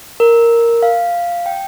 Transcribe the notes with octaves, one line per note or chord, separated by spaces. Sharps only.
A#4
F5
G5